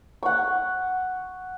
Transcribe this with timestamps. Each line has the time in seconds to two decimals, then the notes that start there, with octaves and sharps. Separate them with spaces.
0.23 F#5 C#6